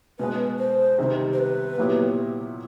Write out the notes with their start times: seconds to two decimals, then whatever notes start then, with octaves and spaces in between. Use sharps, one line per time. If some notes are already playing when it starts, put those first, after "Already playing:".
0.19 B2 G#3 B3 B4
0.59 C5
0.98 C3 D#3 G3 C4
1.33 C5
1.38 B4
1.78 A#2 F#3 B3 E4 G4